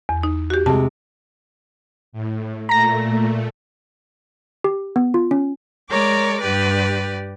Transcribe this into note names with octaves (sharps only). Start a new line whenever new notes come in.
E2
D#4
F#4 G4
C3 G#3 A5
A2
A#2 A3 A#5 A#6
G4
B3
F4
C#4
G#3 A#4 C#5 D5 D6
G2 G4 B4 D5